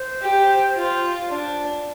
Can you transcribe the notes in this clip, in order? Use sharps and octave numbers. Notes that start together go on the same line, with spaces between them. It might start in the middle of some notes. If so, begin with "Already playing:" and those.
Already playing: C5
G4
F4
D4